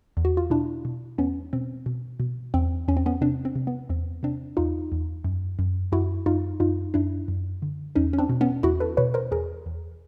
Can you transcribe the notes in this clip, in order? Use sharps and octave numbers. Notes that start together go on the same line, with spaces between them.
E2
F#4
F4
B2 D4 E4
B2
E2 B3 C#4
B2 C4
B2
B2
E2 C4
E2 C#4
C4
B3 C#4
C3 C4 D4
C4
C3
B3
E2 C4
C3 C4 D4
E2 D#4 F4
E2
F#2
F#2
F#2 E4 F#4
F#2 D#4 F4
F#2 D#4 F4
F#2 D4 E4
F#2
D3
E2 C#4 D#4
C#4
C4 D4
B2
B3 C#4
E2 E4 F#4
A4 B4
B2 B4 C#5
A#4 C5
E2 G#4 A#4
E2